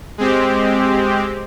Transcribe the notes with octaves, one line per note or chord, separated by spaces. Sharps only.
G#3 C4 G4